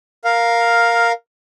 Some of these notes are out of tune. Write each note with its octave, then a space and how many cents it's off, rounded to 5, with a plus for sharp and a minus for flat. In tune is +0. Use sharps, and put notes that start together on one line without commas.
A#4 +0 F5 +5